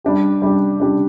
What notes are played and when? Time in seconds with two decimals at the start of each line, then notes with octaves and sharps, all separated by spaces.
0.04 G3 D4 G4
0.42 G3 D4 G4
0.80 G3 D4 G4